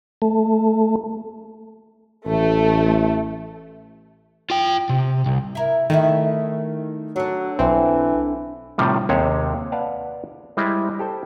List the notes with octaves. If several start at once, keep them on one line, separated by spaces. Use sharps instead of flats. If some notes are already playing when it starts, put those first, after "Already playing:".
A3
A1 A3
F4 G5
C3
C2
E4 A#4
D#3 A3 E4 F#4
D3 F#3 D4
B1 E3 C4
A2 C3 D#3 F3 G3
D#2 C3 G#3 C5 C#5
B4 D5 F5 F#5 A5
G3 G#3 E4 C5 D#5 E5
G4 A4 C5 G5